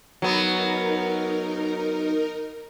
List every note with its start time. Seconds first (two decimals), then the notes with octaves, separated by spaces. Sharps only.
0.22 F#3 B3 D#4 A#4